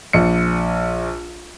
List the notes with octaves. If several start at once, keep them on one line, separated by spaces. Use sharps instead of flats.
A#1 C#7